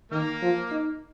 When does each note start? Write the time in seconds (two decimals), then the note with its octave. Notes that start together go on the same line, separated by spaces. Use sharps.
0.11 D#3 A#3 A#4
0.42 F3
0.71 D#4